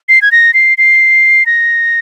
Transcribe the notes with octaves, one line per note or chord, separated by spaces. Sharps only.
C7
G#6
A#6
C7
C7
A#6